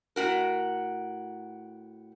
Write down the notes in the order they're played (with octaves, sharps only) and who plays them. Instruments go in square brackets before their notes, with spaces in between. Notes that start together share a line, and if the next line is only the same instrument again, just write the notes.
[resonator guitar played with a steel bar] A2 F#4 A#4